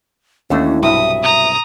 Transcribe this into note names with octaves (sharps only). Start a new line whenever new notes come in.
D#2 E3 A3 C#4 D4 F#4
B1 G2 C3 E4 F#4 E5 D#6
A#5 D#6